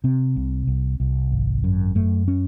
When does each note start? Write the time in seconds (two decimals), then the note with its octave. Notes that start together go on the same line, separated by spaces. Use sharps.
0.04 C3 C4
0.36 C2
0.67 C2
1.00 C2
1.32 G#1
1.64 F#2
1.95 F#2 A3
2.28 C#4